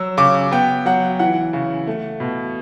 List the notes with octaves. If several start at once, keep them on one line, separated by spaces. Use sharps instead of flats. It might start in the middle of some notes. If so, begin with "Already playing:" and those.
Already playing: F#3 E6
C#3 D6
B3 G5
F#3 F#5
E3 F#5
C#3
A3
B2